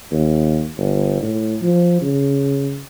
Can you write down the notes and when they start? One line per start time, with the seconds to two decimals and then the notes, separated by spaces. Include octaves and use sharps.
0.12 D#2
0.78 G1
1.22 A2
1.62 F3
2.02 C#3